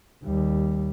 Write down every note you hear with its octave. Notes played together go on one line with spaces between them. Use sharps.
D#2 G3